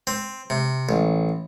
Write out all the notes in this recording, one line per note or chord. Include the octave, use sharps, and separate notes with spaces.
C4
C3
A1